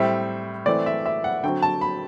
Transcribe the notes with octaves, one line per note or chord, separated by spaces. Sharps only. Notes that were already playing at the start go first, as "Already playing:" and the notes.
Already playing: A2 G3 C4 E5
E3 A3 C4 D5
E5
E5
F#5
D3 F#3 C4 G5
A5
B5